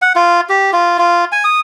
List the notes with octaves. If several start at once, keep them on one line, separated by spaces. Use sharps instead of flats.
F#5
F4
G4
F4
F4
G#5
D#6